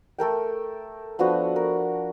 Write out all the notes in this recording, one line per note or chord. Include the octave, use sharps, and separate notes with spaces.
A3 A4 A#4 G5
F3 B3 D4 F#4
A#4